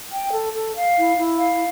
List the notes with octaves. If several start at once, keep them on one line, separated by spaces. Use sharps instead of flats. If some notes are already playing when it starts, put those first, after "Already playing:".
G5
A4
A4
F5
E4
E4
F5